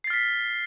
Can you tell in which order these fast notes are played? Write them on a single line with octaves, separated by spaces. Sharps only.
C7 A6 F6 B6